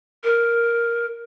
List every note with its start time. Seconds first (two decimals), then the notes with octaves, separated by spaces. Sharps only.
0.24 A#4